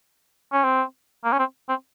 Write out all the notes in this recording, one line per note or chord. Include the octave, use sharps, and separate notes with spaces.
C#4
C4
A#3
C#4
C4
C4